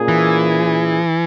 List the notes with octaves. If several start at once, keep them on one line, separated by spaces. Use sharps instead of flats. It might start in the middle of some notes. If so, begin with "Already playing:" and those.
Already playing: A#2 A#3 C#4 G#4
E3